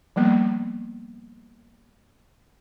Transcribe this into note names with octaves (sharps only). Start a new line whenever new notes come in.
F3 G3 A#3 B3